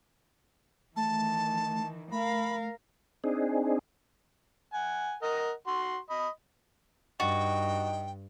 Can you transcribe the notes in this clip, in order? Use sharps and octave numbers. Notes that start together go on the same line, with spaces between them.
D#3 E3 A3 A5
A3 A#4 F5 B5
C4 D4 D#4 G#4
F#5 G#5
A#4 D#5 F#5
F#4 C6
D#5 B5
G2 D#4 F#4 G5